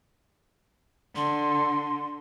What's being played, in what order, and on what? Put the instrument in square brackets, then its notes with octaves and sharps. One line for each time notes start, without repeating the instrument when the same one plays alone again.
[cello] D3 [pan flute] C6